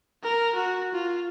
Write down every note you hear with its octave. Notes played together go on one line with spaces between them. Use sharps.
A#4
F#4
F4